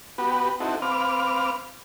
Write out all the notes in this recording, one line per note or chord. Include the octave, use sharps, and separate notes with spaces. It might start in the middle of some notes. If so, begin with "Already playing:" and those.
B3 F#4 G4 B4
C4 D#4 E4 F#4 A4
C4 B4 F5 D6 F6